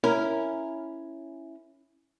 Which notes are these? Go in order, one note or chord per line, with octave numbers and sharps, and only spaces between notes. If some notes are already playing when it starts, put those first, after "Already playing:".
C#4 E4 A#4